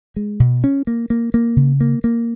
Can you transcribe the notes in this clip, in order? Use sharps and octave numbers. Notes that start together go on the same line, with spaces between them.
G#3
B2
C#4
A#3
A#3
A#3
C#3
A#3
A#3